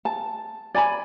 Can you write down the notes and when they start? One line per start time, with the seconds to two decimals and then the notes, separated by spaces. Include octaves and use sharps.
0.05 A5
0.74 D5 G#5 A#5 B5